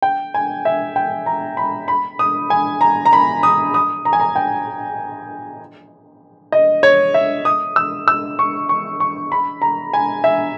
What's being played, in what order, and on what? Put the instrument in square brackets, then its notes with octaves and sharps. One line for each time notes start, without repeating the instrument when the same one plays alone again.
[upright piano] G5
G#5
E5
G5
A#5
B5
B5
D#6
G#5
A#5
A#5
B5
D#6
D#6
A#5
G#5
A#5
G5
D#5
C#5
E5
D#6
E6
E6
C#6
C#6
C#6
B5
A#5
G#5
E5